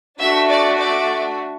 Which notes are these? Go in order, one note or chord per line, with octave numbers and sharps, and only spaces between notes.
A3 D4 F#4 E5
D5
D5